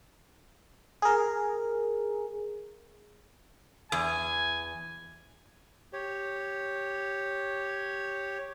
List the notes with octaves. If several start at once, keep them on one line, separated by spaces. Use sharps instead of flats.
G#4 A#4
E2 G#5
G4 C#5